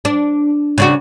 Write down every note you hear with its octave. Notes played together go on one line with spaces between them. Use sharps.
D4
C#3 D4 F#4